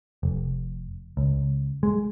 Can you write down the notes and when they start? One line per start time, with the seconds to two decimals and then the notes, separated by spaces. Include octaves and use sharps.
0.23 F1
1.17 C#2
1.83 G#3